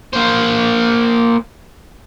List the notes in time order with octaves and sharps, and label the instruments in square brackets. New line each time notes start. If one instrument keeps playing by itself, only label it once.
[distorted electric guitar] A#3 C5